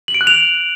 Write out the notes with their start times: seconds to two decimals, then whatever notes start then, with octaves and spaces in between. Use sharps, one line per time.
0.08 F#7
0.14 D7
0.21 F#6
0.27 F7